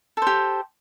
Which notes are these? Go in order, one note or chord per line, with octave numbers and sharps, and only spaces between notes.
G4 A4 C5